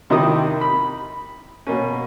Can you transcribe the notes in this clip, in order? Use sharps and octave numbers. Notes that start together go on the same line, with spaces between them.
C3 D#3 D#4 E4 G4 D#6
B5
B2 A#3 C#4